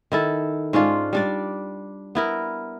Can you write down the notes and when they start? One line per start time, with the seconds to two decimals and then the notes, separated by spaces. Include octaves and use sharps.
0.12 D#3 E4 A4
0.73 G#2 C#4 D4 F4
1.13 G3 D4 D5
2.15 B3 E4 A#4